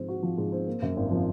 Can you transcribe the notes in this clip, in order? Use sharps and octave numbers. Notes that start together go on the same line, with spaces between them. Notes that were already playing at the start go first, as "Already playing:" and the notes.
Already playing: G#2 F3 C4
F#4
F3
G#2
C4
A#3
F#2
G#1
F3